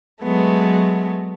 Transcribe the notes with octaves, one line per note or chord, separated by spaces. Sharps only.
F#3 G#3 A3 B3